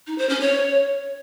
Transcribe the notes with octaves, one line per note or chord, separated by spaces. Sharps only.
D#4
C5
C#4
C#5